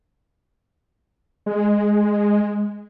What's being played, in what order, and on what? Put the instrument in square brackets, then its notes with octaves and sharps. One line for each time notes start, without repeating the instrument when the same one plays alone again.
[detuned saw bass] G#3